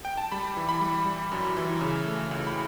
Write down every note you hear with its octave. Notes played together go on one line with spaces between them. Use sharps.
G5
A5
G3 B5
E3
B5
G3
G3
F#2
E3
C#3
A3
C#2
B5